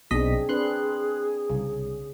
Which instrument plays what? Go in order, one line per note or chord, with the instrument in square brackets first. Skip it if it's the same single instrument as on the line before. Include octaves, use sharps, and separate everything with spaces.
[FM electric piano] B1 D#5 B6 [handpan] C4 D4 [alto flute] G#4
[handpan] C4 D4 B4 [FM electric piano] C6 F#6
[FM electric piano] C2 [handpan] C#3